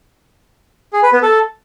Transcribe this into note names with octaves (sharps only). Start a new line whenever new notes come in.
G#4
B4
B3
A4